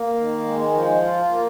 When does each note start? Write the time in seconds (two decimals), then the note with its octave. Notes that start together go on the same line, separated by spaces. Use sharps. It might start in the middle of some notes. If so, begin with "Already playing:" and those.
Already playing: A#3
0.17 D#3
0.45 G#3
0.73 F3
1.02 F4
1.30 A#3